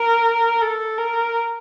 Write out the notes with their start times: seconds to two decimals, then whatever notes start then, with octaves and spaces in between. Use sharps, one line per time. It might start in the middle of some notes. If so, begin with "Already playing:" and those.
Already playing: A#4
0.61 A4
0.98 A#4